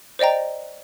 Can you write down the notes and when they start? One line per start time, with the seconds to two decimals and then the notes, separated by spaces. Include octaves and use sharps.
0.19 C5 D5 D#5 G5 A#5